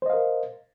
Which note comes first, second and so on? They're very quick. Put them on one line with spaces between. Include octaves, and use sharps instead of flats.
C5 D#5 F5 A#4